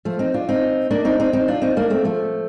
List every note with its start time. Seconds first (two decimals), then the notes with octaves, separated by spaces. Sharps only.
0.05 F3 A3
0.19 C4 D#4
0.34 D4 F4
0.49 C4 D#4
0.91 A#3 D4
1.05 C4 D#4
1.20 C4 D#4
1.33 C4 D#4
1.48 D4 F4
1.62 C4 D#4
1.77 A#3 D4
1.90 A3 C4
2.04 F3 A3